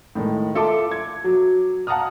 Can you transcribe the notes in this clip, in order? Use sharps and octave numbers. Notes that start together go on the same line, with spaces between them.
A2 D#3 G#3
F4 A4 E5 A5 C6 D6
G#6
F#3
F5 F#5 A5 A#5 D#6 F6